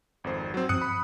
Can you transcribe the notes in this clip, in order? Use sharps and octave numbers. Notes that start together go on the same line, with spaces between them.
G#1 F2 C5
F#3 C4
G2 F3 C4 D#6 F#6 C#7
B5